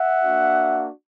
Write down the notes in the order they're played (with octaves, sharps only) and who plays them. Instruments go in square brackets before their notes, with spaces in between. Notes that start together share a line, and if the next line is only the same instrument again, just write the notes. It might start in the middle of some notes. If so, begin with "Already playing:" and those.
Already playing: [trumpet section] E5 F#5
A#3 D4 F#4